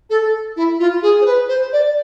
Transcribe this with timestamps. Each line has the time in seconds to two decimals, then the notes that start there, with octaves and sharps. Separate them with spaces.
0.10 A4
0.56 E4
0.79 F4
1.02 G#4
1.21 C5
1.25 B4
1.48 C5
1.72 D5